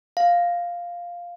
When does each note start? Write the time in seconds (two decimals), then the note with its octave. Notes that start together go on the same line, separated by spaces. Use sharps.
0.17 F5